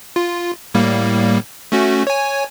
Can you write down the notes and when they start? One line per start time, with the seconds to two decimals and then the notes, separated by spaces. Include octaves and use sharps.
0.16 F4
0.74 A2 G3 A#3
1.72 A3 C#4 F#4
2.07 C#5 G#5